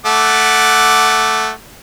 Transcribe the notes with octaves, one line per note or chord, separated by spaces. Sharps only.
A3 F#5 D6